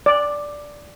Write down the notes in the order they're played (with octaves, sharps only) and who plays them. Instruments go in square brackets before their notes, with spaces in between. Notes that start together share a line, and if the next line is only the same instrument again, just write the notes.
[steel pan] D5